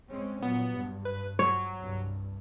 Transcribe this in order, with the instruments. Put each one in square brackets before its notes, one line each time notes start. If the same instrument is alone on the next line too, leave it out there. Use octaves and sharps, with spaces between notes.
[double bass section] G#3 C4 C#4
[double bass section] A#2 F#3 [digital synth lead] B3
[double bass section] G2
[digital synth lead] B4
[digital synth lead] F#3 [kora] C#5
[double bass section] C2 G2